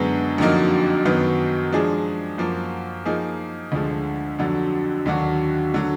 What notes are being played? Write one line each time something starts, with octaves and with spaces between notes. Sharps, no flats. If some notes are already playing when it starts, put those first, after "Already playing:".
Already playing: F#2 D3 G#3 B3
F2 D3 F#3 A#3 D#4
F#2 D#3 F#3 B3
F3 G#3 D4 G#4
F#2 F3 A#3
F3 A#3 D#4 G#4
D2 D3 F3 G#3
F2 D3 F#3
D#2 D3 F#3 D4 F#4
D3 F#3